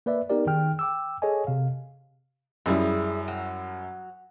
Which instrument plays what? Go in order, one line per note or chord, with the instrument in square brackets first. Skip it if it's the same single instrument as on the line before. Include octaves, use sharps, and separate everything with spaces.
[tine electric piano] A#3 B4 D5 E5
B3 D#4 G4 A#4 D5
D#3 G#4 G5 F6
G5 D6 E6
G#4 A4 C#5 D#5 G#5
C3 F5
[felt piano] F#2 G3 E4 [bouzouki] G#4
[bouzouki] F#3